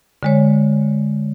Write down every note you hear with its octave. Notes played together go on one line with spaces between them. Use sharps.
D3 G#3 C#5